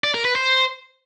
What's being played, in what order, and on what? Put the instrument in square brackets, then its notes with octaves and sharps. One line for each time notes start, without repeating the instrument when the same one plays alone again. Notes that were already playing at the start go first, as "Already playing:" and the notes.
[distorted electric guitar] D5
A#4
B4
C5